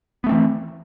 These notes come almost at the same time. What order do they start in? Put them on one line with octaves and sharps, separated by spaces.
B3 A3 C4 E3